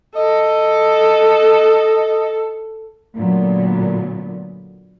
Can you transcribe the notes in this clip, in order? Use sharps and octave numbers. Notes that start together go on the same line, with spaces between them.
A4 D#5
A#2 D3 F#3 A3 B3